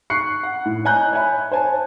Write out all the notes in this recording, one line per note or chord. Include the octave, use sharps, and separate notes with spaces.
C#6 F#6 C7 C#7
F#5
A2
C#5 D#5 G#5 A#5 F#6 G6
C#5 E5 G#5 B5
C5 C#5 G#5 A5